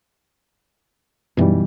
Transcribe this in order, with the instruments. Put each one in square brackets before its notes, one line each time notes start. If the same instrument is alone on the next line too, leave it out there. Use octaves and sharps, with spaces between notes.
[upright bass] F#2 D#4 [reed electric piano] B2 E3 G3